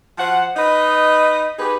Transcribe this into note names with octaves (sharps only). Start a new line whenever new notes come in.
F3 C5 F#5
D#4 B4 D#5
D#4 G4 G#4 B4